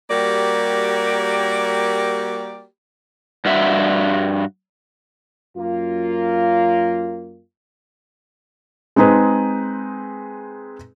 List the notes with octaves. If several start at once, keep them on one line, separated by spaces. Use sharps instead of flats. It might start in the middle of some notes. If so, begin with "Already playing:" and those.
G3 A#3 F#4 G4 A#4 D5
G2 F#4 E5
F#2 A#3 F4
G#3 C4 D#4 G#4 B4